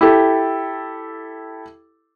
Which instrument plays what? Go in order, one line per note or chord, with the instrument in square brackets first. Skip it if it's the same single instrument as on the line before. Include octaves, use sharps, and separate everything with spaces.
[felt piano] E4 G4 A4